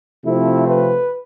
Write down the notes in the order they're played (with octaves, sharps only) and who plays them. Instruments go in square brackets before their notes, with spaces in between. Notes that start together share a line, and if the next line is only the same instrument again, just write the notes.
[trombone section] C3 F3 A3 C4 E4
B4